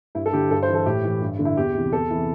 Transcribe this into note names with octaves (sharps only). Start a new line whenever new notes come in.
G2 E4
A4
D3 G4
G2 A4
C5
E3
A4
A2 G4
E3
G2
D3
E4
E2 G4
C3 E3
E2 A4
C3 E3